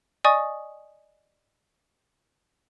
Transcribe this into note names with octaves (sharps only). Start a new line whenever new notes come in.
D5 D#5 G#5 C#6 D#6